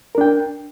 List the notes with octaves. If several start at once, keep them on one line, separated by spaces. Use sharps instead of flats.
D4 A#4 G5